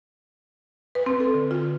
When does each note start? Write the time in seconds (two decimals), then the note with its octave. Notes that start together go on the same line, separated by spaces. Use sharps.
0.95 B4
1.06 C4
1.20 A4
1.34 D3
1.51 F4